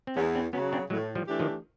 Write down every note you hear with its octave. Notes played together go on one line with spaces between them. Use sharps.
C4
E2 B3 C#4
C4 D4
C#3 F#3 B3 C#4
C4 D4
A2 F#3 G#3
F3 G3
E3 A3 D4 G4
D#3 F3